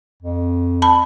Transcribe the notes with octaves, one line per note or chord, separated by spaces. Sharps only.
F2
A5 B5